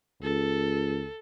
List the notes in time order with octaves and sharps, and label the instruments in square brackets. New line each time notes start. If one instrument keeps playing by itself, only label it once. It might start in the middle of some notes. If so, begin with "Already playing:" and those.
[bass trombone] C#2 [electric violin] A4